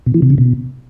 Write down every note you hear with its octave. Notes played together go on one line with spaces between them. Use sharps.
B2
E3
C3
C#3
B2